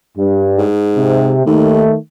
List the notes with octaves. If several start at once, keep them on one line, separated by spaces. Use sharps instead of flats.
G2
G#2
C3
D#2 D#3 A3